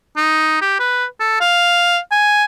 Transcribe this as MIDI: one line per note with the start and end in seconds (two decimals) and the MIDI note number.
0.17 0.60 63
0.61 0.79 67
0.79 1.05 71
1.20 1.39 69
1.41 1.98 77
2.12 2.44 80